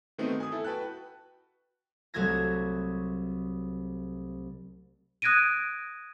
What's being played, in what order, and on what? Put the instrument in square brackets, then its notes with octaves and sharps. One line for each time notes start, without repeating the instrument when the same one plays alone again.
[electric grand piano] D#3 A3 B3 C4 D#4 F#4
G#5 D#6
E4 A4
F#4 B4 G5 A5 F#6
[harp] C2 F#3 A3 F#4 G#6 A#6
[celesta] D#6 F#6 G#6 A#6 D7 D#7